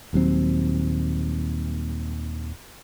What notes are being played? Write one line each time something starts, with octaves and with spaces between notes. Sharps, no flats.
D#1 D#2 F#3 C4